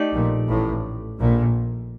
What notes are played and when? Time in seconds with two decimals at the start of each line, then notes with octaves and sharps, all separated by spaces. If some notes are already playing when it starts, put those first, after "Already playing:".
Already playing: A3 D#4 G4 D5
0.14 A#1 A#2
0.49 A1 A2
1.19 A#1 A#2